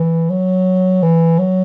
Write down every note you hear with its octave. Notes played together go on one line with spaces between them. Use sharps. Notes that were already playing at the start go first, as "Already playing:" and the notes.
Already playing: E3
F#3
E3
F#3